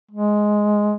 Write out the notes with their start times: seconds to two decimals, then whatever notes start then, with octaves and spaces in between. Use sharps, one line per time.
0.11 G#3